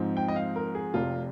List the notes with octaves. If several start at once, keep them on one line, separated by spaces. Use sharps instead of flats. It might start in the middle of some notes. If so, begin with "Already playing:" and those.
Already playing: G#2 F3 G#3 C4 D#4
G5
D#5
F5
A#4
G#4
F1 F2 C3 F4